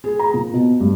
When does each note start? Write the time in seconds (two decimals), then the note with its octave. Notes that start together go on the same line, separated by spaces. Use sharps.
0.04 G#4
0.19 A#5
0.34 A#2
0.54 B2
0.80 G2